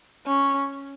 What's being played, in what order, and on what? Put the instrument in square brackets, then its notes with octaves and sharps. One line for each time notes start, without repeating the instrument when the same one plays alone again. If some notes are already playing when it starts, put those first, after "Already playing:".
[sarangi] C#4